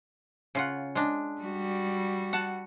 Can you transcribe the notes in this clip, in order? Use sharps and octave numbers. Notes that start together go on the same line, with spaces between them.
C#3 F4 F#5
G#3 D4
G3 F#4
F#5 A5